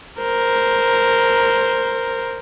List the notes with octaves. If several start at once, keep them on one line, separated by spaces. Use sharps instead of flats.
A#4 C5